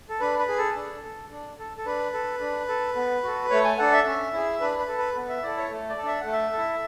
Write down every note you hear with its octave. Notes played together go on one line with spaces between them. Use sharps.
A4
D4 B4
B4
G#4
A4
D4
A4
D4
A4
A4
D4 B4
A4
D4
A4
B3
F#4 A4
A3 C#5
G#5
D4 A4 F#5
E5
C#4
E4 G#4
D4 B4
B4
A4
B4
B3
E5
E4 A4 D5
C#5
A3
D5
A4
D4 E5
A3 F#5
E5
A4
E4